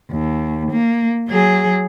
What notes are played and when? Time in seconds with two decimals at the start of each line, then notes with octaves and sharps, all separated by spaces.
0.11 D#2
0.72 A#3
1.29 F#3 G#4